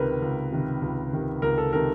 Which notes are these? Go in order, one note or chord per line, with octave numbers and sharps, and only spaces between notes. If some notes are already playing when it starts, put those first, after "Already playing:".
Already playing: C#2 C3 D#3 A#4 B4
C#2
C3 D#3
C#2
C3 D#3
C#2 A#4
A4
C3 D#3 A#4